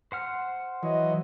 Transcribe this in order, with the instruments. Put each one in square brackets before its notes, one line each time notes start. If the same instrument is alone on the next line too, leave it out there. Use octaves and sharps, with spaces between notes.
[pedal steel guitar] C5 F#5 F6
[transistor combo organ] E3 F#3 [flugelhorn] D#5